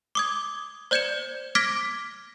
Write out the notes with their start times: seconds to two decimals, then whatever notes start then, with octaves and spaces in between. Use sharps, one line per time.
0.15 D6 D#6 G#6
0.91 C5 D5 G6 G#6 C#7 E7
1.55 D6 F6 G#6 A#6 B6 D7